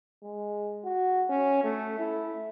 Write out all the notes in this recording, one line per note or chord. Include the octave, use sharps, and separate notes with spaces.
G#3
F#4
C#4
A3
E4